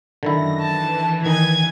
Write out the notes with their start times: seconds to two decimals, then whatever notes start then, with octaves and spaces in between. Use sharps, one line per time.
0.23 F#2 D3 D#3 E4 A#6
0.61 E3 A5
1.26 D#3 D#4 G#5 G#6